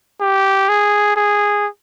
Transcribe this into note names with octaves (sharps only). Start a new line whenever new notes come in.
G4
G#4
G#4